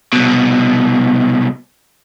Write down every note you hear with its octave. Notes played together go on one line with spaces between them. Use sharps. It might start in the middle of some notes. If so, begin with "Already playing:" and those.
C2 B2